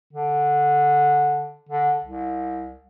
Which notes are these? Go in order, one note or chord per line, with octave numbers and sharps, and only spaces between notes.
D3
D3
C2